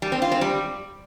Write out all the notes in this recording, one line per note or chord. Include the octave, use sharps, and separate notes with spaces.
G3
C4
F4
C4
G3